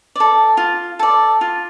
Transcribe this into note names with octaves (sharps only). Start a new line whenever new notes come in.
A4 D5
F4
A4 D5
F4